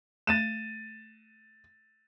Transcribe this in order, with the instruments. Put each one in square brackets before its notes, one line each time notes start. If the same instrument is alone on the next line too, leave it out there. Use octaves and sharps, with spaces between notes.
[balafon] A3 [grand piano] A6 D#7 E7